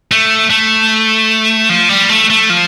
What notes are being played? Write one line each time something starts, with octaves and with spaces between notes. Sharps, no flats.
A3
A3
F3
G3
A3
A3
F3